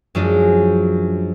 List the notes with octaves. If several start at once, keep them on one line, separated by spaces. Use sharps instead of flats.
F#2 F3 G#3 D4